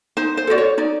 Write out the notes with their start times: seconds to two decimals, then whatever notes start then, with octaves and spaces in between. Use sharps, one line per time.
0.17 D#4 C5
0.37 C5
0.47 F#4 A4 D5
0.58 C#5
0.78 D#4 D5